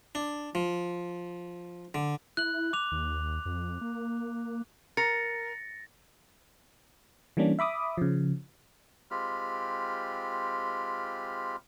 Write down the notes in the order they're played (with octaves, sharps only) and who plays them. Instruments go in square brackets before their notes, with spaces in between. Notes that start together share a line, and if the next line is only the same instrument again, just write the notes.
[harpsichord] D4
F3
D3
[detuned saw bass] E4 [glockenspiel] F#6 F#7
[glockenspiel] D6 F7
[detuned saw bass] D#2
F2
A#3
[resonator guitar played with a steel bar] A#4 [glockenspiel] A6 A#6 [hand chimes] C#7
[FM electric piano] E3 G3 A#3 C#4 D4
E5 B5 D6 D#6
C#3 F3
[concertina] G#3 C4 F4 G4 B5 F6